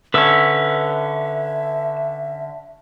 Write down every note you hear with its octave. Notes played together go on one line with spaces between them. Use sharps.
D3 C#4 B4 E5 E6